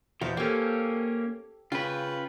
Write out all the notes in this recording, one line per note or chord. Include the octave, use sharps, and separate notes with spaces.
E2 B2 C5 F5
A#3 C#4 G4 A4
C#3 F4 B4 G5